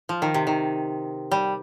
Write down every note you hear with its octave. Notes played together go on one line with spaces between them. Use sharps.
F3
D#3
C3
D#3
G3